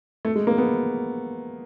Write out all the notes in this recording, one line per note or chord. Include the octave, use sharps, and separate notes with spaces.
A3
G#3
A#3
B3